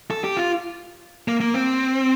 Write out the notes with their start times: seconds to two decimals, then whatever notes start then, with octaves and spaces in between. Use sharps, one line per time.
0.11 A4
0.24 G4
0.37 F4
1.28 A#3
1.40 A#3
1.54 C4